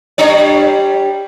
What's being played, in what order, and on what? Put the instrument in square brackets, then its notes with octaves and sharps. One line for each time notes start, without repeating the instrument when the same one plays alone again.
[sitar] G3 D4 C#5